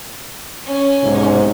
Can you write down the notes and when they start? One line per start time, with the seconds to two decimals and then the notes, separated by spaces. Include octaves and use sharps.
0.68 C#4
1.03 B1 G#2 C3